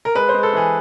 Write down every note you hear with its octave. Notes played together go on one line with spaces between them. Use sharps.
A#4
G#3 B4
C5
G#3
A4
E3 G#4